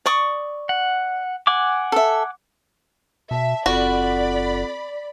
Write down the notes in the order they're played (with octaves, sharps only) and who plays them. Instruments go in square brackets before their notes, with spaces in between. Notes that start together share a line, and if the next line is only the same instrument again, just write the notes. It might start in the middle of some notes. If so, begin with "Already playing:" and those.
[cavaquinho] D5 C#6 D#6
[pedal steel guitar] F#5
F#5 G#5 D6
[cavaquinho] A4 E5
[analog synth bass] B2 [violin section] E5 [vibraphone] A5
[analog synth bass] F#1 [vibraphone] C4 F4 A4 [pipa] F#4 [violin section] D5 B5